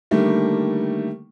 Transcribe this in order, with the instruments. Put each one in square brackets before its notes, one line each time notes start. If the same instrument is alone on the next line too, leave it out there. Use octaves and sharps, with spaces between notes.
[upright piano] D3 D#3 G3 A3 A#3